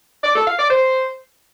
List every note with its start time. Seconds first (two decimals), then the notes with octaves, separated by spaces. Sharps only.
0.24 D5
0.35 A4
0.47 F5
0.59 D5
0.71 C5